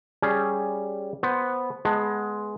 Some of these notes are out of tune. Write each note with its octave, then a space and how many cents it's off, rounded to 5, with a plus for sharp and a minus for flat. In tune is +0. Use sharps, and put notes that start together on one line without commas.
G3 +0 C#4 +0 G#4 +0
B3 +0 C5 +0
G#3 +15 B3 +0 A5 +15